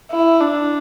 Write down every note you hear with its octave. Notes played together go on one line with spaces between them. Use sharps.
E4
D4